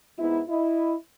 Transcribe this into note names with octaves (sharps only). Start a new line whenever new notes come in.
G#2 B3 E4
E4 D#5